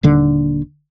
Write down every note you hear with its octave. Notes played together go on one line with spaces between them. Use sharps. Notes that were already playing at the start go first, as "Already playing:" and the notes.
D#1 D#2 D3